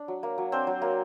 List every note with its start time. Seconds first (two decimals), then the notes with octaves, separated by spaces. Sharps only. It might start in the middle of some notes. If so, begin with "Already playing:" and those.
Already playing: D4
0.08 F#3
0.23 A#3
0.38 F#3
0.52 C4 D4 C5
0.67 F#3
0.82 A#3